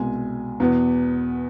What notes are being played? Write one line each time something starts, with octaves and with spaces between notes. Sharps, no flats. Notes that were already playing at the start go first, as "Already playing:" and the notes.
Already playing: C2 B2 G#3 G#5
E2 B2 B3